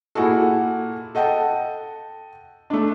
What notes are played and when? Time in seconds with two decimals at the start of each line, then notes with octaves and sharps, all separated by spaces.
0.15 A#2 E4 F#4 G#4 A4
1.15 A4 D#5 F#5 G5 A5
2.70 A3 D4